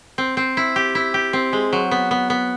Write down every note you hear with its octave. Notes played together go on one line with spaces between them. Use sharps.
C4
C4
E4
G4
E4
G4
C4
G#3
F#3
B3
B3
B3